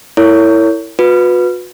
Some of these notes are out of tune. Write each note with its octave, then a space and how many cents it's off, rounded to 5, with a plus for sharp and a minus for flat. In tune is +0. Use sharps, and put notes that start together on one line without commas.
E4 +0 A#4 -35 C#5 +20
F#4 -40 B4 +0